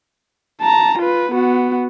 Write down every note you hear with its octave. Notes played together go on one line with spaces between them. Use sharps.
A5 A#5
F4 B4
B3 F#4